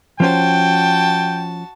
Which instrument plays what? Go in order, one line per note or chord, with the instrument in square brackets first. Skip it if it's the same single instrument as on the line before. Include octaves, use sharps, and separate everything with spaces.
[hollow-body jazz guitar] F3 C#4 C5 [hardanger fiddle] F#4 A5 [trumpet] G5